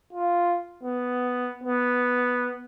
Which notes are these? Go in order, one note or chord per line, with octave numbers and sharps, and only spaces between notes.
F4
B3
B3